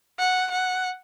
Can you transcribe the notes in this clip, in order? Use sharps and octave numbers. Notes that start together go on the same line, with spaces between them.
F#5
F#5